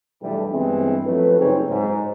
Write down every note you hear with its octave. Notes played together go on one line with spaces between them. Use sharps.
B1 E2 G2 E3 G3 A3
G2 E3 G#3 B3 C4
F3 F#3 A3 C4 B4
F#1 C2 C4 D#4 G#4 C#5
G#2